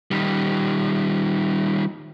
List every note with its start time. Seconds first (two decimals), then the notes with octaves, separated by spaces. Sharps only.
0.11 D#3 G3